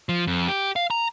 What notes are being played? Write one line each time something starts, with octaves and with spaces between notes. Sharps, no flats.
F3
F2
G4
F5
A#5